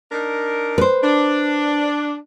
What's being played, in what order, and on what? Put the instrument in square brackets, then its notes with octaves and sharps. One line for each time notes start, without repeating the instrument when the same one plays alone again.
[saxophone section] D4 D#4 A#4
[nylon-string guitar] B4 C5
[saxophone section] D4